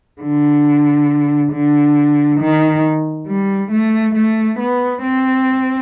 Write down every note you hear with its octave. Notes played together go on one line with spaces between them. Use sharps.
D3
D3
D#3
G3
A3
A3
B3
C4